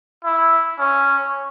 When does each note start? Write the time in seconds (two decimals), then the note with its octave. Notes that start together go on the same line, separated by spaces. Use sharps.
0.24 E4
0.79 C#4